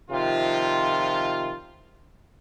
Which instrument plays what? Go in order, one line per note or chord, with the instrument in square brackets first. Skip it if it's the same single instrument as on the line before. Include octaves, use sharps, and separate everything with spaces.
[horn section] C3 D#3 F3 F4